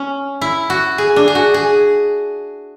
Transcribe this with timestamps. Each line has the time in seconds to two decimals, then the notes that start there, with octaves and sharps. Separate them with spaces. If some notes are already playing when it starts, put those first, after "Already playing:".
Already playing: C#4
0.41 E4
0.70 F#4
0.98 G#4
1.16 D4
1.28 G#4
1.35 F#4
1.54 G#4